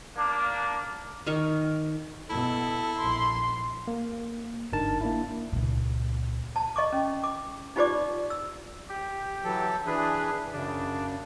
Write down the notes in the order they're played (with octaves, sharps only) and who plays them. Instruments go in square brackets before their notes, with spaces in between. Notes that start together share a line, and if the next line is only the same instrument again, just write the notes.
[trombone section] A#3 D4
[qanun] D#3 A#4 C#6
[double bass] B2 [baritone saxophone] E4 [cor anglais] A4
[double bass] A#1 [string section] C6
[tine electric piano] A#3
G1 G#2 D4 D#4 A#4 A5
A#3 D4 E4
[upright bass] C#2 A#2
[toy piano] A5
D#5 C#6 D6
C#4
D6
D#4 F4 G4 C5 D5 D6
E6
[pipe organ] G4
[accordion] E3 F#3 A4
[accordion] E3 D4 G#4 [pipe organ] B4
[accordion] F#2 C#3 [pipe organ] D4